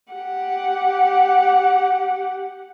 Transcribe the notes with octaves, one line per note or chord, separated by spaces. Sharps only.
G4 F#5